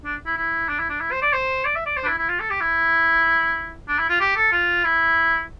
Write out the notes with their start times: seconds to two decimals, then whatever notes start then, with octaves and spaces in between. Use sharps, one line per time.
0.05 D4
0.26 E4
0.37 E4
0.69 D4
0.79 E4
0.90 D4
1.01 E4
1.12 C5
1.22 D5
1.33 C5
1.65 D5
1.76 E5
1.86 D5
1.97 C5
2.04 D4
2.07 E4
2.18 E4
2.29 F4
2.40 A4
2.50 G4
2.61 E4
3.88 D4
3.99 E4
4.10 F4
4.20 G4
4.36 A4
4.52 F4
4.84 E4